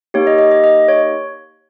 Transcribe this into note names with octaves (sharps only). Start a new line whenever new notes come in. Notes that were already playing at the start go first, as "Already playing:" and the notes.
A#3 D#4 G4 C#5
D#5
D#5
D#5
D#5
C#5